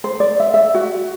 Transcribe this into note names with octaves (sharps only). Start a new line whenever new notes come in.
C5
D5
E5
E5
F#4